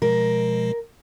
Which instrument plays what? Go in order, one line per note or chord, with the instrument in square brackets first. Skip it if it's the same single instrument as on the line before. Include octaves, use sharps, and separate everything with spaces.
[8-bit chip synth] B2 F3 G#3 [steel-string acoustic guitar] A#4